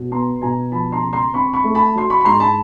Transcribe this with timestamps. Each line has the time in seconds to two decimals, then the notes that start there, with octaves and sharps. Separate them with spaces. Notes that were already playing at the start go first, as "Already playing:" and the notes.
Already playing: B2 F#3
0.11 B3 A#5 C6
0.42 B2 G#5 A#5
0.72 F3 A5 B5
0.92 A#5 C6
1.03 C#3
1.13 A#5 C6
1.33 C4 B5 C#6
1.53 B5 C#6
1.64 A3
1.75 A5 B5
1.95 F#3 C6
2.10 B5 C#6
2.21 B5
2.25 G#2 A#5 C6
2.40 A5 B5